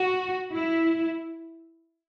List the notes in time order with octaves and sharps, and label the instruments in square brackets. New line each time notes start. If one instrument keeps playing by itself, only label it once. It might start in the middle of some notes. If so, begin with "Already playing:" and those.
Already playing: [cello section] F#4
E4